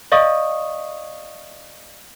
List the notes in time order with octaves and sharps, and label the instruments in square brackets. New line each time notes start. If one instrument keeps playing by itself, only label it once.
[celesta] D5 D#5 F5 C#6 D#6